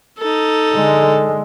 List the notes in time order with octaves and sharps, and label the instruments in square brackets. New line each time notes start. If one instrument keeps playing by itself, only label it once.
[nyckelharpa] D#4 A4
[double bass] D3 G#3